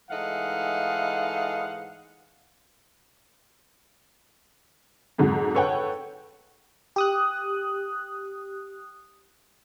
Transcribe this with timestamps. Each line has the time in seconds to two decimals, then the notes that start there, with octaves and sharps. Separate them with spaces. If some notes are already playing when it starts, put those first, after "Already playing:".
0.10 G#2 E3 A3 D#4 F5 F#5
5.18 F2 G#2 F#3
5.55 A4 B4 C#5 F#5 G5
6.96 G4 D#6 F#6